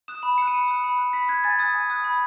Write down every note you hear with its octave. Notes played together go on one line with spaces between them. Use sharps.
D#6 F#6 E7
B5 E7
D#6 F#6 C#7
D#7
B5 C#7
D#6 F#6
B5
F#6
B5 B6
F#6 G#6
G#5 A6
D#6 F#6 A6
G#5
D#6 F#6
B5